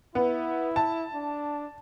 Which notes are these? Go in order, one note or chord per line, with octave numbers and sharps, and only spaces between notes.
B3 E4
A5
D4